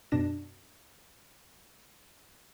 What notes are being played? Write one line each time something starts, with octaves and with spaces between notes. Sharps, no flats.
F#2 B2 D4 A#6 E7